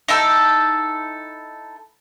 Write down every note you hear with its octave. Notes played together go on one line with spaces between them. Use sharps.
D#4 E4 A4 G5